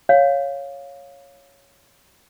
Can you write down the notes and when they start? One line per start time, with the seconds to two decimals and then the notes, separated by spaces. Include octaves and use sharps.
0.09 C#5 F5